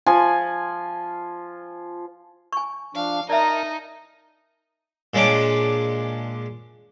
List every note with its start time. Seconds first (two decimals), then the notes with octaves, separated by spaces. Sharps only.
0.06 F3 G#5
2.53 G#5 C#6
2.95 F3 D4 F5
3.30 D#4 A#4 D5 E5 A5 A#5
5.14 A#2 G#3 C#4 D4 D6